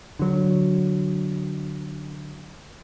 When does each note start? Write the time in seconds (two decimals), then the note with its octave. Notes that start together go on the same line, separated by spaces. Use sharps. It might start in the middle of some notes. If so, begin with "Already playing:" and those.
0.19 D3 F#3